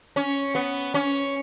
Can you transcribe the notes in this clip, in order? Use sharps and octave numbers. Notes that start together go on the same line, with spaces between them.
C#4
B3
C#4